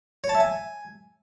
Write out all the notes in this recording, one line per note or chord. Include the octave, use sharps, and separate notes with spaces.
C#5
A5
E5
G#5